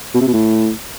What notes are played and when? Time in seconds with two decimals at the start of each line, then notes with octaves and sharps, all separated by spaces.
0.15 B2
0.21 C3
0.27 B2
0.34 A2